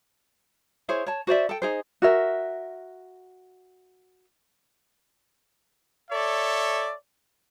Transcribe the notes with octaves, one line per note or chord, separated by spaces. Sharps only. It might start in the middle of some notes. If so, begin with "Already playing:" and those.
E4 G#4 C5 C#5
C#5 A5
F#4 C5 D5 E5
A4 G5
D#4 G#4 C5
F#4 A#4 E5
A4 C#5 D5 E5